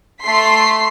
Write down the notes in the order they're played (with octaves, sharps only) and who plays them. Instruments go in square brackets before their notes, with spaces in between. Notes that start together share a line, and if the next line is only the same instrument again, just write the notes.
[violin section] A3 C6 B6 C7